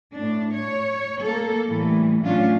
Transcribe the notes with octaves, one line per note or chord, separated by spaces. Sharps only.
A2 D4
C#5
A#3 A4
A2 E3 G3
A2 F#3 C#4 D4 F4